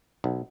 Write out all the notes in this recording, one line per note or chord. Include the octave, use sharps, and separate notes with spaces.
B1